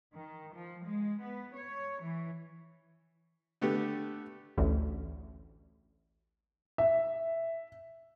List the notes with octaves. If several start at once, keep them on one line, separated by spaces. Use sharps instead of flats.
D#3
F3
G#3
B3
C#5
E3
D3 A3 B3 G4
A1 D2
E5